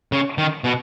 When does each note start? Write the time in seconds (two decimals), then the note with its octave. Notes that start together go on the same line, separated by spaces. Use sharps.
0.12 C#3
0.38 D#3
0.64 B2